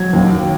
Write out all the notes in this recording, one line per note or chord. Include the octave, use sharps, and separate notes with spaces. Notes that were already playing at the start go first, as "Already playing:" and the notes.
Already playing: F#3 G#6
D#2